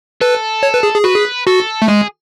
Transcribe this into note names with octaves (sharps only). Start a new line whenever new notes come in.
A4 B4
C#5
B4
G#4
G#4
F#4 B4
G#4
F#4 A4
A3
G#3 G#4